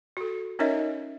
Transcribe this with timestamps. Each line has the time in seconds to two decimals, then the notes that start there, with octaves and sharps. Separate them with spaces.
0.17 F#4 A4
0.59 C#4 D#4 A#4 C#5 D#5 E5